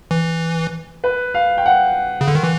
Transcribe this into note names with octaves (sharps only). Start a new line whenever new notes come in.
E3
B4
F5
G5
F#5
C#3
D3
D#3
E3